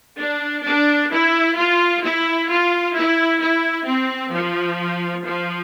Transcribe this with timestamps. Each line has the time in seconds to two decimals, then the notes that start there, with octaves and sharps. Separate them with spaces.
0.18 D4
0.64 D4
1.11 E4
1.57 F4
2.03 E4
2.49 F4
2.95 E4
3.41 E4
3.87 C4
4.32 F3
5.25 F3